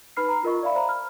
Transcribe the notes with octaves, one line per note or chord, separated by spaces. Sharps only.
D#4 B4 B5 F6 C7
A#5
F4 A#4 D#5 C#6
D5 E5 F5 B5
C5 A#5 B5
F6